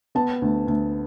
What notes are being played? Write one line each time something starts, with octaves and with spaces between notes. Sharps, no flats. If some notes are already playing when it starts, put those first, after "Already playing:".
B3 A5
D2
D2